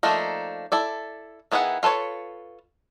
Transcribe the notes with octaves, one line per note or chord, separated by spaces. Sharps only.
F3 A3 A#3 D4 D#4
E4 A4 D5
D#3 B3 E4 G#4 F#5
F4 A4 B4 C#5